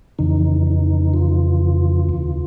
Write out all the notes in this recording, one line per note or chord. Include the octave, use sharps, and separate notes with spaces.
F2 C#3 E3 D#4
D#4
F4
D#2 C#3 E3